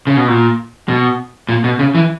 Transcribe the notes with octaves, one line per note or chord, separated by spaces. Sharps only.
C#3
B2
A#2
B2
A#2
B2
C#3
E3